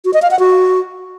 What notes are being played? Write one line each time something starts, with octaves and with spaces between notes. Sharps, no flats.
F#4
D#5
F5
F#5
F#4